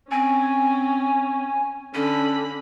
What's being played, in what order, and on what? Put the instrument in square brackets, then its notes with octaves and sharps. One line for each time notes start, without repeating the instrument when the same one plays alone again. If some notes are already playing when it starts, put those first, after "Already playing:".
[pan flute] C4 [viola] C#4 [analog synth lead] G#5
[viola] D3 B5 [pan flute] C#4